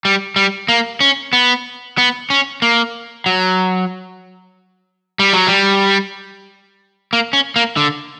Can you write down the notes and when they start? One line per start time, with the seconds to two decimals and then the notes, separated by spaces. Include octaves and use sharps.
0.05 G3
0.36 G3
0.68 A#3
1.00 C#4
1.33 B3
1.98 B3
2.30 C#4
2.62 A#3
3.26 F#3
5.19 G3
5.33 F#3
5.47 G3
7.13 A#3
7.33 C#4
7.56 A#3
7.77 D3